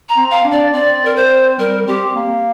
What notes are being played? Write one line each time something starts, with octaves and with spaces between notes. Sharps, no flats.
A#5
C4
F5
D4
D5
C4 D5
A#4
C5
G3 A#4
C4 G4
A#3